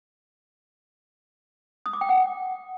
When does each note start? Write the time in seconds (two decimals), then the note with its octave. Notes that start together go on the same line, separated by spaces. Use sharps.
1.86 D#6
1.93 D6
2.01 G5
2.09 F#5